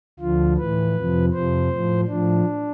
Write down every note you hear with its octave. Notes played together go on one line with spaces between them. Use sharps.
D2 D3 F3 F4
A2 E3 B4
F2 C3 F3
F2 C3 F3 C5
A2 F3
A2 F3 D4